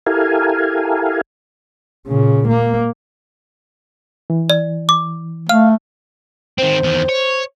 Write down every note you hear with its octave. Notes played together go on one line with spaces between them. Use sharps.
E4 G4 A4 A#4 F5 G#5
A#2 C#3
A#3
E3
D5
D6
A3 F5 F6
D#3 C4 C5
E2 D#3
C#5